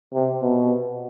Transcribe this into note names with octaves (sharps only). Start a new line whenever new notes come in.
C3
B2